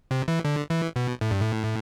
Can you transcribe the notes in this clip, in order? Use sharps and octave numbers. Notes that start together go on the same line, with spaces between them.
C3
E3
D3
E3
B2
A2
G2
A2